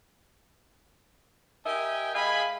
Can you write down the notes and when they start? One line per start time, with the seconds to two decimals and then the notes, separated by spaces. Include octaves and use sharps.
1.65 G4 A#4 D#5 E5 G5 G#5
2.14 G#3 D#5 F5 G#5 B5